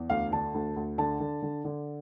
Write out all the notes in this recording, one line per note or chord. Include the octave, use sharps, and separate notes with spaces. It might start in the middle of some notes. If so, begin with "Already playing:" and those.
Already playing: E2
D2 F5
D3 A5
D2
D2
D3 A5
D3
D3
D3